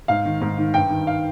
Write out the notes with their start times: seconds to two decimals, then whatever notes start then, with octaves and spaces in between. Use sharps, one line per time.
0.08 G#2 F5
0.25 D#3
0.41 G#2
0.58 D#3
0.74 G2 G5
0.90 D#3
1.07 F5